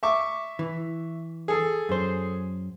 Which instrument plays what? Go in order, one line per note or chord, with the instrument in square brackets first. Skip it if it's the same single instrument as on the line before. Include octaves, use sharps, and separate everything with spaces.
[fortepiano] E5 C#6 D6
[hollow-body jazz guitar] E3
[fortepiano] G#4 A4
[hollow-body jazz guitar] F#2 C5